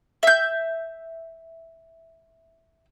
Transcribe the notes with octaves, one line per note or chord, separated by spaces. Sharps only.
E5 G6